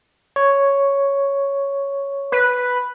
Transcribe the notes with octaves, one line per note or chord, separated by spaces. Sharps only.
C#5
B4